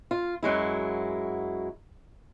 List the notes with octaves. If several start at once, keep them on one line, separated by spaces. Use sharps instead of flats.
F4
F#2 F#3 G#3 E4